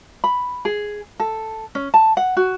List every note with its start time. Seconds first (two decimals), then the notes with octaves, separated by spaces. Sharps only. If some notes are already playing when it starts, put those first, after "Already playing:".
0.24 B5
0.65 G#4
1.20 A4
1.75 C#4
1.94 A5
2.17 F#5
2.37 F#4